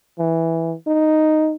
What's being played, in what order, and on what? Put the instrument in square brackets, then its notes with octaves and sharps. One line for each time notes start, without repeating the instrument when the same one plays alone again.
[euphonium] E3
D#4